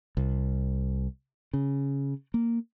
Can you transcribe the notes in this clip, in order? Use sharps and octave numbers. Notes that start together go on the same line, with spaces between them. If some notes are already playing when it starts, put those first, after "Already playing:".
C2
C#3
A#3